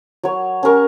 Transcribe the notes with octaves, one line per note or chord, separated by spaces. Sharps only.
F#3 C#5
C#4 G4 A#4 C#6